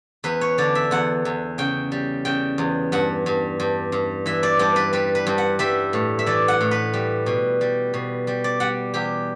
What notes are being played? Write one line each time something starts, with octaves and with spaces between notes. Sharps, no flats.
E2 B4
C#5
D3 D5
E5
E2 F#5
E2
C#3 G5
G3
C#3 G5
E2
G2 F#5
G2
G2
G2
E3 E5
D5
G2 D5
B4
G3 B4
B4
G2
F#5
G3 E5
A2
E5
E3 D5
F#5
A2
B4
G3
B2
G3
B2
G3
D5
G3 F#5
E2 G4